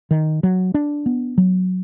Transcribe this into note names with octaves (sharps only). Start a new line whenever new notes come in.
D#3
F#3
D4
B3
F#3